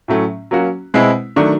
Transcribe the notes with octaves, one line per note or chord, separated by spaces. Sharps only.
A2 F#3 A3 C#4
F#3 A#3 C#4 F#4
B2 G#3 C4 E4
D#3 F#3 A3 D4 F#4